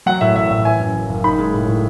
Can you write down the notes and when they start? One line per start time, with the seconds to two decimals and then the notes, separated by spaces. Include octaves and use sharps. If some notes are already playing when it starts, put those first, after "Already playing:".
0.06 F#3 F#5
0.21 A2 E5
0.36 A1 E5
0.50 A1 E5
0.65 E3 G#5
0.80 F#2
0.96 F#1
1.09 F#1
1.24 D#4 B5
1.38 G#3
1.54 A2
1.68 A2